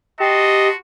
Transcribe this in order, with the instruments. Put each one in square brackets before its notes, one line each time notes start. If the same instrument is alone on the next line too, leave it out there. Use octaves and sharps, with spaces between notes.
[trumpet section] F#4 A5 C6 [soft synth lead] G4 [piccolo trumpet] D#5